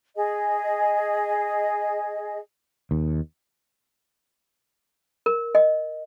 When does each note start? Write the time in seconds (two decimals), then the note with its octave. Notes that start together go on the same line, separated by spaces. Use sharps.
0.17 G#4 D#5
2.91 D#2
5.26 A#4
5.55 D#5